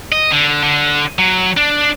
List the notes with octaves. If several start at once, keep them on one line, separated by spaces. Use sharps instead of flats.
D#5
D3
D3
F#3
D4